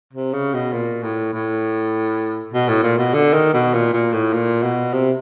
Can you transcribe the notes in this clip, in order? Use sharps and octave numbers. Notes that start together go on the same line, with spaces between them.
C3
C#3
B2
A#2
A2
A2
B2
A2
A#2
B2
D3
D#3
B2
A#2
A#2
A2
A#2
B2
C3